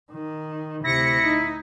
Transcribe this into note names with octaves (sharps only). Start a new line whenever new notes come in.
D#3
D2 C3 E4 A#6 C#7
D#4